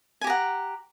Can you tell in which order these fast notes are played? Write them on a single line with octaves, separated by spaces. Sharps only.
G#5 G4 A#5 F#5